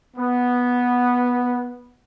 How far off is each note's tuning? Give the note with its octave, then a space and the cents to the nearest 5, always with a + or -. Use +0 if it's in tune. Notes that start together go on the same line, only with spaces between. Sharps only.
B3 -5